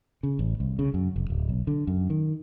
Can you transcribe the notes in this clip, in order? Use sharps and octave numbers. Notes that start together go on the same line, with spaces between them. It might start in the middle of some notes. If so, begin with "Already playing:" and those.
C#3
A1
C2
C#3
F#2
F1
D1
B1
D3
F#2
D#3